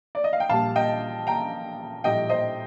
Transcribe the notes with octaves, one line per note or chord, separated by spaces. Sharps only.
D5
D#5
F5
G5
A#1 A#2 G3 F5 A5
D#5 G5
G5 A#5
A#1 A2 G3 D#5 G5
C5 D#5